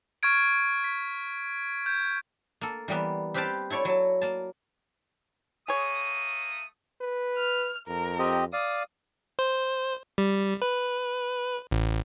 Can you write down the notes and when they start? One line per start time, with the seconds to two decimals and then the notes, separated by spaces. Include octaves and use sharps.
0.23 C#6 F6 G#6 D7
0.84 B6
1.86 G6
2.61 A#3 A4
2.88 E3 G3 A#3 B3
3.34 C4 G4 B4 F5 G5 A5
3.70 E4 A4 C#5 D5
3.85 F#3 A5
4.21 A#3 A5
5.68 A3 A#3 G#4 C#5 D#6
7.01 B4
7.37 F6
7.88 F2 A#4
8.19 C4 G4 D#5
8.53 D5 F5 D#6
9.39 C5
10.18 G3
10.62 B4
11.71 A1